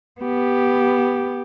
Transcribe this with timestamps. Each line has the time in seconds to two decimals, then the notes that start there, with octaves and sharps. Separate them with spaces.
0.21 B3 G4